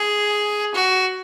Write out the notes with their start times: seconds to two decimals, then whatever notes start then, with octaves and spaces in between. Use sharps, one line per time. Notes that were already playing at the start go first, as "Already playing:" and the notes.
Already playing: G#4
0.74 F#4